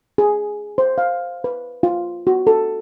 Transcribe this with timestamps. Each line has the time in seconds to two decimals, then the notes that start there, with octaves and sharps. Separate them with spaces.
0.18 G#4
0.78 C5
0.98 F5
1.44 B4
1.83 F4
2.27 F#4
2.47 A4